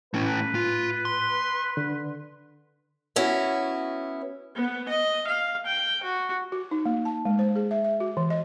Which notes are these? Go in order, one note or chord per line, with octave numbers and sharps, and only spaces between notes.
A2 A3 C#4 B4
F4
C6
D3
B3 C#4 E4 F#4
B3
D#5
F5
G5
F#4
F#4
D#4
A#3
A5
G#3
C5
G#4
E5
E5
F#4
E3
D#5